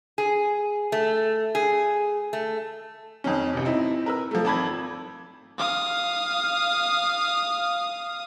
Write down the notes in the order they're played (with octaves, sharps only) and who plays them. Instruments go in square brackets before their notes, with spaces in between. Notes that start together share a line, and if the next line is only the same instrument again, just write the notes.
[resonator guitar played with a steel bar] G#4
A3
G#4
A3
[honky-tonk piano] F2 D#3 C#4
A1 C3
C4 D#4 E4
A#4 B4 E6
F3 A3
G#1 A5 B5 G#6
[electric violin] F5 D#6